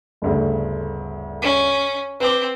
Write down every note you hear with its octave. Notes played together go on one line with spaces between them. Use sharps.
G1 D2 C#3
C#4
C4 B4 G5 D6